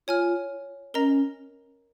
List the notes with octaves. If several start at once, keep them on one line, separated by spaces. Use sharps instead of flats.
F4 C#5 G#5 F6
C#4 A#4 D#5 A#5